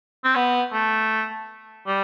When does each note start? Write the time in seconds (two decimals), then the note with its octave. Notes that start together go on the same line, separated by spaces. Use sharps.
0.24 C4
0.35 B3
0.72 A3
1.86 G3